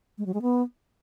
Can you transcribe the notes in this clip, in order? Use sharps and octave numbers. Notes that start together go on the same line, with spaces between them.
G#3
F#3
G#3
B3